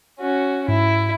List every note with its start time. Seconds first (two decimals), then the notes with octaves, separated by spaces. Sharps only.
0.20 C#4 F#4
0.68 G#2 E4